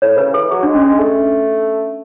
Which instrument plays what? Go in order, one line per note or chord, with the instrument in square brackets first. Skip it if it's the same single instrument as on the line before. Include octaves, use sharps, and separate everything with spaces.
[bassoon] A2 [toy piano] C#5
[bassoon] C#3 [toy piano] B4
[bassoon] E3 [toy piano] A4
[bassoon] F#3 [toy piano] G#4
[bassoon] G#3 [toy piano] D4
[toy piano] C#4
[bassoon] G#3
A3